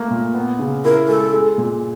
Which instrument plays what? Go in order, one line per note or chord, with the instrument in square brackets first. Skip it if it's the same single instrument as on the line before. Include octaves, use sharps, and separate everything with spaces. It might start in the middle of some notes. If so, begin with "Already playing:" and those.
Already playing: [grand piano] A3 A#3
A#2
B3
C#3
[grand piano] E4 [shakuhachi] A#4
[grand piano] G#3 [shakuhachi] A4
[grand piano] G#3
A#2